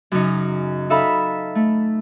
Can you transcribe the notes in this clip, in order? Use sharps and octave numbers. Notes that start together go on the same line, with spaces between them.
F#2 C#3 D#4
D#4 A4 E5 F5 B5
A3